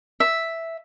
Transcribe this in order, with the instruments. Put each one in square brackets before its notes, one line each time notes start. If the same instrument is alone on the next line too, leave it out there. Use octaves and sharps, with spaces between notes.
[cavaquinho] E5